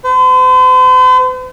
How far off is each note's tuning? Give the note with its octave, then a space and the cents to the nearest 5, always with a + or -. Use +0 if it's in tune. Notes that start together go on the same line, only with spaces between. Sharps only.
C5 -45